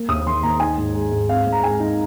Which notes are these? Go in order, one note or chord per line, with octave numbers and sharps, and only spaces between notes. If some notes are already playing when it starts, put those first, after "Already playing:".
Already playing: A#3
D#2 D#6
D#3 C6
D#2 A#5
D#4 G#5
G#2
G#3
G#2
C4 F5
G#2
A#5
G#3 G#5
D#4